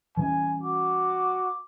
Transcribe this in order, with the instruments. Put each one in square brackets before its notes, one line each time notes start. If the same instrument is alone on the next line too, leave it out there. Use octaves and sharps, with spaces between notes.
[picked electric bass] E3 G3 C#4 [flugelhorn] G#5
[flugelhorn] F#4 [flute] D6